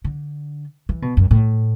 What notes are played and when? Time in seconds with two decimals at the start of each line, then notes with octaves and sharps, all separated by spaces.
0.04 D3
0.89 E3
1.02 B2
1.17 F#2
1.31 A2